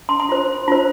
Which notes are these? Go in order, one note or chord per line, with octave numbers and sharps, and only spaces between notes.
C6
C6
F4 C5
F4 C5